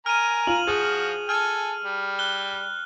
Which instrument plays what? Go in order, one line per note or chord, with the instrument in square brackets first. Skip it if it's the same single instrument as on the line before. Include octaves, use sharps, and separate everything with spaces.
[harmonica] A#4 G#5 A#5 [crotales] F6 D#7
[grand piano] F4 [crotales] F7 F#7
[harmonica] F3 F#4 [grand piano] G#4
[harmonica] A4 G#5 [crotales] F6
[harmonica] G3
[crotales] F#6 G7